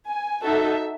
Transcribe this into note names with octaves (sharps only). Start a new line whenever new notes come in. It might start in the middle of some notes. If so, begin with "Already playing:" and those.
G#5
D#4 F#4 A4 E5